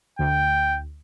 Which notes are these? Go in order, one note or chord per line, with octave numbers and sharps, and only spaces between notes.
D2 G5